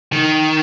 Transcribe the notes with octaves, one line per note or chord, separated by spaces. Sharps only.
D#3